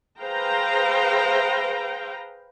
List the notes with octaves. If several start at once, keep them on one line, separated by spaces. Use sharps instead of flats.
G#4 B4 C5 F5 G5 A#5